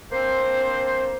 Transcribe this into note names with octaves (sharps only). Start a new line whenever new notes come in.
A#3 C4 D4 C5